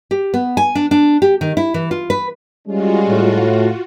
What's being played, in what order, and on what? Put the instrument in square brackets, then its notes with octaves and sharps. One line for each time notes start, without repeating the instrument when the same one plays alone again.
[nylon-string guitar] G4
B3
G#5
D4
D4
G4
D#3
E4
E3
F4
B4
[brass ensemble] G3 G#3 C#4 [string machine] F4 F#4
[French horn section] A2